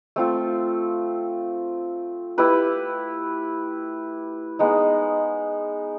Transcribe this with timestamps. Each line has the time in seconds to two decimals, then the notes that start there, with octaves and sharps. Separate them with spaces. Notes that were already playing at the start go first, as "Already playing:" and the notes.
0.16 A3 C4 F4
2.38 E4 G4 B4
4.59 G#3 B3 D#4